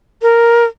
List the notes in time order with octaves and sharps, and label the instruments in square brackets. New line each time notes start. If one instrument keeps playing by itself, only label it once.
[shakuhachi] A#4